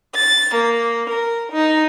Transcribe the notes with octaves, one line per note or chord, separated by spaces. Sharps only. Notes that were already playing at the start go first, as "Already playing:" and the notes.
A6
A#3
A#4
D#4